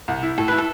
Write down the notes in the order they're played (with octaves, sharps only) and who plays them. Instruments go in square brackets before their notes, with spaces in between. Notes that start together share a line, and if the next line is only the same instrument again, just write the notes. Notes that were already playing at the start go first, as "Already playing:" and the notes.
[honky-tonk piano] C2
E4
[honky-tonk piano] A2 [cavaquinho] A4
[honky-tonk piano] E4 [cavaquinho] B4
[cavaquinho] A4